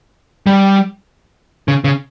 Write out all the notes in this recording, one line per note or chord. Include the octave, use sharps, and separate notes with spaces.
G3
C#3
C#3